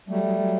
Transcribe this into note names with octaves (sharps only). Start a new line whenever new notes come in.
F#3 G3 A3
F#3
F#3